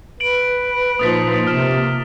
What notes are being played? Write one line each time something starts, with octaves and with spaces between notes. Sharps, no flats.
B4 D7 F#7
A#2 F3 D#4 D#6 A6 B6
C3 A#3 F6 E7